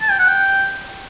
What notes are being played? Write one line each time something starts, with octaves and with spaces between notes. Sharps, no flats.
A5
G5
F#5
G5